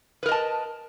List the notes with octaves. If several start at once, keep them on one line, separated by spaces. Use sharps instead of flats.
A#4 B4 D#5 A5